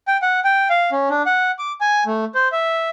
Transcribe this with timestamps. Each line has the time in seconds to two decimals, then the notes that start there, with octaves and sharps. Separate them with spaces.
0.08 G5
0.22 F#5
0.44 G5
0.70 F5
0.92 C#4
1.10 D4
1.26 F#5
1.59 D6
1.81 G#5
2.06 A3
2.35 C5
2.52 E5